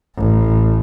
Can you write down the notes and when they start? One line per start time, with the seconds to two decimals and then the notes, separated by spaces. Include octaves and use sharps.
0.16 A1